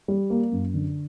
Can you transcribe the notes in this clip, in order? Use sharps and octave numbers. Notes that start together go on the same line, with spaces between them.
G3
A#3
F#2
D3